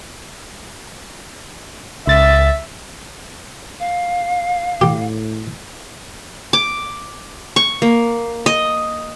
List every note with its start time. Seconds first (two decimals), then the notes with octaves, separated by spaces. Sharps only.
2.07 C#2 E5 A6
3.80 F5
4.81 A2 G4
6.53 D6
7.56 C#6
7.82 A#3
8.46 D#5